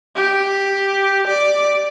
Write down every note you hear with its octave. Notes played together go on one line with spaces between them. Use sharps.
G4
D5